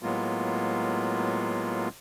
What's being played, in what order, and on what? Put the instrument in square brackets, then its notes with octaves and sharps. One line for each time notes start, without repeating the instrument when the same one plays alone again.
[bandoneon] A2 F#3 G#3 A#3 B3 F4